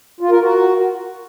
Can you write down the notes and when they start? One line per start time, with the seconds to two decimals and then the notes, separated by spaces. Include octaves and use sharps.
0.20 F4
0.30 A#4
0.40 F#4